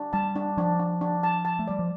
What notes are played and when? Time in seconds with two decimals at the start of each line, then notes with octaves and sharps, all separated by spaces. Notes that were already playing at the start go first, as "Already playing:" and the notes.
Already playing: D4
0.13 G3 A5
0.36 D4
0.57 F3 D4
0.79 D4
1.01 D4
1.23 A5
1.45 A5
1.59 A3
1.68 G3 D5
1.79 F3